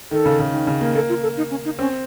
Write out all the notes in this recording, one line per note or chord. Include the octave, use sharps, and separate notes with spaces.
D#3 A4
C#3
C#3
D#3
C#3
A#3
A#3 A4
F4
A4
D#4
C#4
D#4
C4 C#4